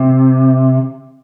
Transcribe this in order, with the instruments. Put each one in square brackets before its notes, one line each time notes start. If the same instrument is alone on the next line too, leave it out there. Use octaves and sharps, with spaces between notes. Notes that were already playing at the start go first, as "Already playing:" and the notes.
Already playing: [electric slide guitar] C3